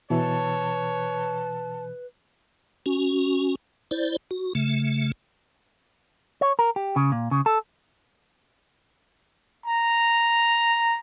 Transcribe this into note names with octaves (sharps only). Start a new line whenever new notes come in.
B2 E3 B4 C#5 A5
C#4 F#4
E4 C5 D5
F#4
C#3 A3
C#5
A#4
G4
C#3
A#2
C#3
A4
A#5